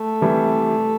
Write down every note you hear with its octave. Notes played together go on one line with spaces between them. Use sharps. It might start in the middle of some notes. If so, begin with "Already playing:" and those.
Already playing: A3
C3 E3 G3